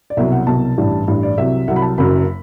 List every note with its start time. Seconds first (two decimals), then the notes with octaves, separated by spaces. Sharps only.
0.10 D5
0.17 C2 B2 F#3 E5
0.32 F#5
0.47 C2 B2 F#3 A5
0.77 A1 G2 E3 G3
1.07 A1 G2 E3 G3
1.23 D5
1.37 C2 C3 F#3 E5
1.68 C2 C3 F#3 F#5
1.76 B5
1.82 A5
1.98 F#1 F#2 F#3 B5